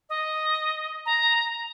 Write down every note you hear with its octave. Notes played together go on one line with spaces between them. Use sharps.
D#5
A#5